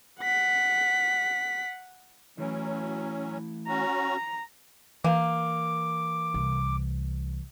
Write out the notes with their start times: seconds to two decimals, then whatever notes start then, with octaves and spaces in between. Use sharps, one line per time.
0.20 F#5 B6
2.38 E3 F#3 A3 C#4 E4
3.68 C#4 F#4 A#5
5.04 E3 A#3 D6
6.34 C2